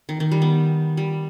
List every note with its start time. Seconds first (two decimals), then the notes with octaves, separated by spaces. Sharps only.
0.09 D#3
0.20 D#3
0.31 G3
0.42 B3
0.97 G3